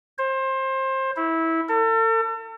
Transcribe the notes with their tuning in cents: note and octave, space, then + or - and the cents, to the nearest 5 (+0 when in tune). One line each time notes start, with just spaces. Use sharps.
C5 +25
E4 -15
A4 +40